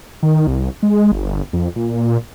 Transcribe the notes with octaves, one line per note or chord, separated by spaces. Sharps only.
D#3
C2
G#3
G1
F2
A#2